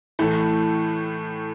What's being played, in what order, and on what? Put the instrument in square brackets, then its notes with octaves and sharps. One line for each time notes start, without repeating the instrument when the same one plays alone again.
[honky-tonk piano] A2 E3 A3